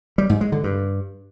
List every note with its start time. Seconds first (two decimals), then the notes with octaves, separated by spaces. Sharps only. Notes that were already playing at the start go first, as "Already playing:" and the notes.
0.18 G3
0.30 G#2
0.41 G#3
0.52 D3
0.64 G2